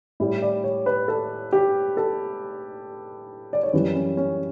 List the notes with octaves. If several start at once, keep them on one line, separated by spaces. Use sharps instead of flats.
A2 G3 E4
D5
C#5
B4
A4
G4
A4
D5
C#5
F#2 E3 G3 B4
C#4
C#4